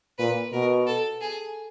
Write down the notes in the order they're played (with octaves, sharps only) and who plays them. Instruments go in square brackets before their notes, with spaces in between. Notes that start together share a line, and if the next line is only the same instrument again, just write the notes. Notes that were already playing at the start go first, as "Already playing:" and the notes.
[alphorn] A#2 [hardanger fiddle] B4
[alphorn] B2 [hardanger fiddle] A#4
[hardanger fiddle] A4
G#4